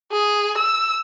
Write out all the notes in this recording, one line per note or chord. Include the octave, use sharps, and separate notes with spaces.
G#4
E6